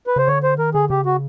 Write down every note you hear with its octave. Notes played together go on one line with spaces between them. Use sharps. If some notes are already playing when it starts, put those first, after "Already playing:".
B4
C#3 C5
D3 C#5
C5
D#3 A#4
D3 G#4
C#3 G4
F#4